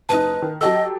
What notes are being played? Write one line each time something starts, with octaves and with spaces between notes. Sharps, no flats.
F#1 D#4 B4 A5
D#3
F#3 G4 A4 D#5 A5 E6